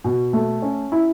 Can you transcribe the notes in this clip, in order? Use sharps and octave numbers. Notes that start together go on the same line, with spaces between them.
B2
A3
C#4
E4